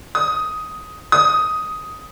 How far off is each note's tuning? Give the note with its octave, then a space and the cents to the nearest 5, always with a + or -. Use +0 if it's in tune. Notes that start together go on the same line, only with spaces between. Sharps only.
D#6 +10
D#6 +10